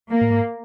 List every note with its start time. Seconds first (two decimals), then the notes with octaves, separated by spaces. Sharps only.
0.11 A#3
0.21 A2
0.31 G#2